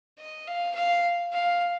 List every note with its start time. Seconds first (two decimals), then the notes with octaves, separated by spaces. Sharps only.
0.19 D#5
0.47 F5
0.75 F5
1.33 F5